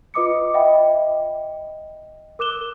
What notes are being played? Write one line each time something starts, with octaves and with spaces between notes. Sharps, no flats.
F4 B4 D#5 D6 D#6 C#7
D#5 E5 F#5 G5 B5
A#4 D6 F#6 E7 G7